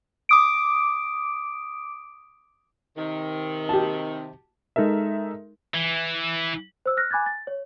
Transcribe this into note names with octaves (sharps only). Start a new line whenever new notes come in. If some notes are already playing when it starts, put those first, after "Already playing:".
D6 D#6 D7
C3 D#3
G4 A5
G#3 D#4 A4 A#4 E5
E3
C5 E6
F6 F#6 A#6
G#5 B5 D6 F#6 G#6 A6
A6
C#5